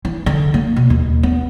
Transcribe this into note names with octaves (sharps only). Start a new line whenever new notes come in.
E3
D3
A#3
B2
D#2
B3